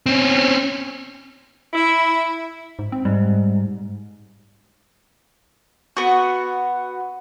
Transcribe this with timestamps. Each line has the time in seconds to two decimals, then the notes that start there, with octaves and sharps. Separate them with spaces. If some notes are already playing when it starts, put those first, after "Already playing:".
0.06 C4 C#4
1.73 E4
2.79 G#2
2.92 C4
3.05 G#2 G3
5.97 B3 F#4